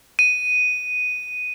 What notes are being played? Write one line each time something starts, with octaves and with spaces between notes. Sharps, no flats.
D#7